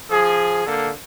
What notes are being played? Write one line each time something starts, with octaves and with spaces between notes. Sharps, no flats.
F3 G#4
D3 A#3 A4